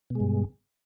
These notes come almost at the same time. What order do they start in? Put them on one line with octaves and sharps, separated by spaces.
B2 G#3 G2